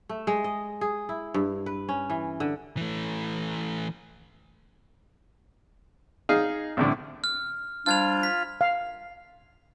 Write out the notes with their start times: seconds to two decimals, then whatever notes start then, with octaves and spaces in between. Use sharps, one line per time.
0.09 A3
0.27 G#3
0.44 D#5
0.81 G#4
1.09 E4
1.34 G2
1.66 B4
1.89 C#4
2.10 E3
2.40 D3
2.77 E3 A3
6.29 D#4 G#4 F5 G#5
6.77 C2 A2 D3
7.24 F6
7.86 F3 G3 D4 F4 F6 G#6 F7
8.23 B6
8.61 F5